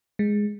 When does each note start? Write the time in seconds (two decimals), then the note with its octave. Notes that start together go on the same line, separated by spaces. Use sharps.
0.19 G#3